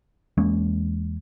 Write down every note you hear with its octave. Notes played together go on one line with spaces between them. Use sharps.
E2 G#3 A#3 C#4